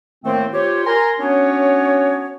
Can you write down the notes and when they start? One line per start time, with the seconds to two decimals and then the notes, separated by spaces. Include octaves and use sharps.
0.25 A2 D#3 A3 A#3 C4
0.53 F4 G4 C5 C#5
0.86 A#4 G#5 A#5 C6
1.20 B3 C#4 D4 F#4 C#5